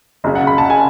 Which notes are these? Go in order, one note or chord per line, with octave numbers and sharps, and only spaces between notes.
F#1 F#2 C#3
F#5
B5
A5
C#3 G#5